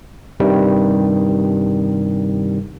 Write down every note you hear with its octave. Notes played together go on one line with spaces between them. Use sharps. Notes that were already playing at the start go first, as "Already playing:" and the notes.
G2 C3 D#3 G3